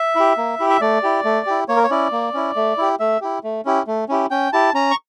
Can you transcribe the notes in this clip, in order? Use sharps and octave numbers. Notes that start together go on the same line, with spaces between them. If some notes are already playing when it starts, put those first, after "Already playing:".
Already playing: E5
E4 G4
A#3
E4 G4
E5
A3 D5
E4 G4
A3
E4 G4
A#3 C#5
A#4
C#5
C#4 E4 D5
A#3
C#4 E4
A3
E4 G4
A3 E5
E4 G4
A3
C#4 E4 G4
A3
C#4 E4 G4
C#4 G5
E4 G4 A5
C#4 A#5
C#6